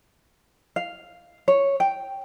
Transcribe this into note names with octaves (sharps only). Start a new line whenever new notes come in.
F5
C#5
G5